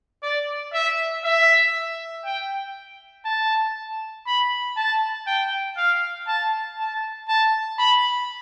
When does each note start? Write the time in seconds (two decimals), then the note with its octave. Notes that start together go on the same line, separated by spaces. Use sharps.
0.23 D5
0.73 E5
1.24 E5
2.25 G5
3.25 A5
4.27 B5
4.77 A5
5.27 G5
5.77 F5
6.27 A5
6.78 A5
7.28 A5
7.79 B5